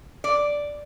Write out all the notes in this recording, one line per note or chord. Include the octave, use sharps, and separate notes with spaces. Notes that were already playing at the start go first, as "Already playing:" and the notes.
D5